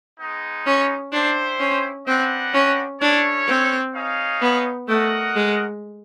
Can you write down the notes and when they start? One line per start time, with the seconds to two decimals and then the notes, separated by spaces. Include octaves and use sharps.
0.19 G#3 B3 D#4
0.66 C#4
1.12 D4 E4 G4 C5
1.60 C#4
2.06 C4 D4 G4 B4 D#5 F#5
2.54 C#4
3.01 C#4 D4 E4 A4 C#5
3.48 C4
3.94 D#4 G#4 C#5 F5
4.42 B3
4.88 A3 F#4 A#4 D#5 F#5
5.36 G#3